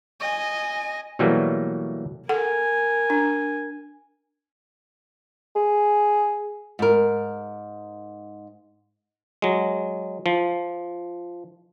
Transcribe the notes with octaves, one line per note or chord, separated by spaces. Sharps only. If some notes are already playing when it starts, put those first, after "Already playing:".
D#5 G#5
B2 E3 F#3 G3 A3 A#3
A4 A#4 F#5 G#5
D4
G#4
G#2 A#4
F#3 G#3
F3